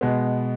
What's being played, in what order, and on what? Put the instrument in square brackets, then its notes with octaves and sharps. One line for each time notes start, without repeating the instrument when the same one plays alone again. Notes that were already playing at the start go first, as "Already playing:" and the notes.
[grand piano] B2 G#3 B3